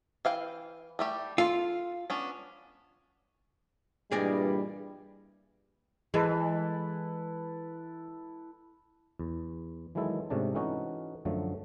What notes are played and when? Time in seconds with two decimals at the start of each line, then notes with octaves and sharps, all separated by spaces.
0.25 E3 F5 G5
0.99 G3 A3 G4
1.38 F4 A4
2.10 B3 C#4 D4
4.11 G2 A#2 E3 G3 G#4 D5 D#5
6.14 E3 G#3 E4 A4 B4
9.19 E2
9.95 D#3 E3 F#3 G#3 E4 A4
10.30 G#2 C3 A3 C#4 D4 A5
10.55 E3 A3 C#4 D#4 F#4
11.25 F#2 D3 F3 F#3 A3